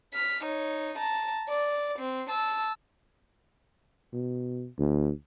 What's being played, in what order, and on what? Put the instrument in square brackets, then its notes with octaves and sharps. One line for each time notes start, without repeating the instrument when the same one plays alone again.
[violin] F6 B6
D#4 C#5
A5 A#5
D5
C4
A5 E6
[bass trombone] B2
D2